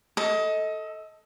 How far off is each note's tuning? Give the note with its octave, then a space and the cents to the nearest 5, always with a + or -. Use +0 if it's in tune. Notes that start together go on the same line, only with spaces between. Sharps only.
A4 +0 D#5 +25